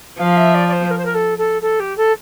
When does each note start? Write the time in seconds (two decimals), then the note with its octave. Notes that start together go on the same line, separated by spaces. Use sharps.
0.19 F3 F5
0.36 E5
0.54 D5
0.67 D5
0.72 C5
0.90 A#4
0.98 C5
1.05 A#4
1.14 A4
1.38 A4
1.61 A4
1.79 G4
1.97 A4